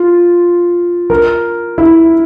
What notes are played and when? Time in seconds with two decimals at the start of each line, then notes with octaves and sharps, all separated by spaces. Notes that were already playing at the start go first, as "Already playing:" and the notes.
Already playing: F4
1.10 A#4
1.78 E4